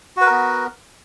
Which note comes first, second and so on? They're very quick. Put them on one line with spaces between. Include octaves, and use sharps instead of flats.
F#4 B4 A#4 B3